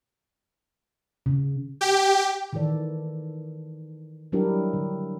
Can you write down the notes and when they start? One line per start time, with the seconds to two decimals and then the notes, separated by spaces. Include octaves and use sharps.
1.26 C#3
1.81 G4
2.53 D#3 E3 E4 A4 D5
4.32 F#3 G3 D4 E4 G4 A#4
4.73 D3